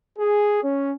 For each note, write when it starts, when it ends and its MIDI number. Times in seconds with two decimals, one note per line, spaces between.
0.19 0.61 68
0.64 0.93 61